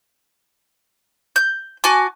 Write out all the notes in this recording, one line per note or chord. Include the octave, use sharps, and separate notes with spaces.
G6
F#4 G#5 A5 D6